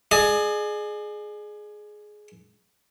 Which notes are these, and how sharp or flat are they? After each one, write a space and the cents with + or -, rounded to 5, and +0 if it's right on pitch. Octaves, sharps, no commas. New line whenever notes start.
G#4 +15 D5 +45